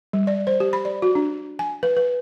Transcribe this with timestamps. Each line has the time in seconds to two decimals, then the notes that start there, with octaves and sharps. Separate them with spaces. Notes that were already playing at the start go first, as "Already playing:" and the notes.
0.13 G3
0.27 D5
0.47 C5
0.60 G4
0.73 B5
0.85 D5
1.02 F#4
1.15 D4
1.59 G#5
1.83 B4
1.97 B4